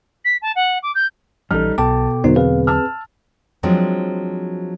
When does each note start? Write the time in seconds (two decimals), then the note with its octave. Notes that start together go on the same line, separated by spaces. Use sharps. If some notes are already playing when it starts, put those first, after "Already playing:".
0.25 B6
0.42 A5
0.56 F#5
0.83 D6
0.95 G6
1.51 A#1 E3 G3 C#4 D#4 A4 F6
1.78 B1 B2 A4 G5 A5 D6
2.24 E2 D3 F#3 B3 D#4 F#4 A#4 C5
2.36 C4 G#4 B4 F5
2.67 A5 E6 F6
3.63 F3 F#3 G#3 C4 D4 F#4